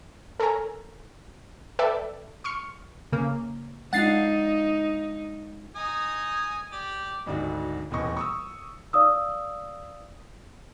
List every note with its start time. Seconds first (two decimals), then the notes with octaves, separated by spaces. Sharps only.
0.40 A4 A#4 C#5 G#5 A#5
1.79 A4 B4 D5 E5 G5
2.44 C6 C#6 F6 C#7
3.13 C#3 A#3
3.93 G#3 D4 D#4 F4 F#5 A6 C7
5.75 D#4 G#5 D#6
6.72 G4 D5
7.26 G#1 D2 D3 D4 D#4 F#4
7.91 D#1 E2 A2 D#5 C#6
8.17 C#6 D#6 E6
8.93 D5 F5 D#6 E6